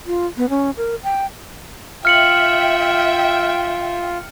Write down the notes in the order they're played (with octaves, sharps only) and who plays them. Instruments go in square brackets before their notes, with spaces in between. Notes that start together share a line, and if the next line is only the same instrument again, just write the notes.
[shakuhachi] F4
B3
C#4
A#4
G5
[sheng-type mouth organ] F4 [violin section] E5 G5 [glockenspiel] F6 C#7 F#7